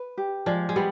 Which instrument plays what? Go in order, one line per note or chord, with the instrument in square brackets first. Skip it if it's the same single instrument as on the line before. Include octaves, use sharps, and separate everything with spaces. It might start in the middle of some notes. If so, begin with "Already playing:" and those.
Already playing: [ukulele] B4
G4
[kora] F3 G#3 [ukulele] D5
[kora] G#3
[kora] G3 B3 [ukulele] G4